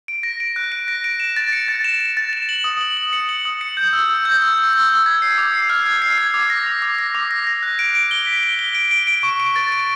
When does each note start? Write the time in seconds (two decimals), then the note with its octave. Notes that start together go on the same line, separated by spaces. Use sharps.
0.08 D7
0.23 A#6
0.40 D7
0.56 F#6
0.72 D7
0.88 A#6
1.04 D7
1.20 E7
1.37 A6
1.53 C#7
1.68 A6
1.84 E7
2.00 E7
2.17 A6
2.33 E7
2.49 F#7
2.64 D#6
2.81 F#7
2.97 F#7
3.13 C#7
3.29 F#7
3.45 D#6
3.61 C#7
3.77 G6
3.93 E6
4.10 E6
4.25 G6
4.42 E6
4.58 E6
4.73 E6
4.89 E6
5.06 G#6
5.22 C7
5.38 D6
5.54 C7
5.69 F6
5.86 G#6
6.02 C7
6.18 G#6
6.34 D6
6.50 A#6
6.66 D6
6.82 D6
6.98 A#6
7.15 D6
7.31 A#6
7.47 A#6
7.63 F#6
7.79 D7
7.95 D7
8.11 G7
8.27 B6
8.43 G7
8.59 G7
8.75 D7
8.91 D7
9.07 D7
9.23 C#6
9.40 D7
9.56 A6
9.72 D7